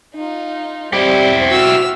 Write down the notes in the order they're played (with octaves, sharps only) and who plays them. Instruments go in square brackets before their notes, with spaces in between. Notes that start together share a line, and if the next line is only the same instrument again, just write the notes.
[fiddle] D#4 F4
[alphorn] G3 [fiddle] C4 C5 [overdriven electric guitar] E4 G4
[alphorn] F#4 [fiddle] E6 F6